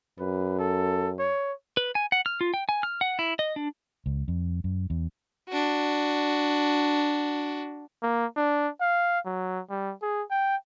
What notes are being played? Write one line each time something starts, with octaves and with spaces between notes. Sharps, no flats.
F#2 B4
A4
C#5
B4
G#5
F#5
F6
F4
G5
G#5
F6
F#5
E4
D#5
D4
C#2
F2
F#2
E2
D4 F#4
A#3
D4
F5
F#3
G3
G#4
G5